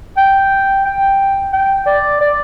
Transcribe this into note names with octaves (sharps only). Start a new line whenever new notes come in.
G5
G5
G5
D5
D5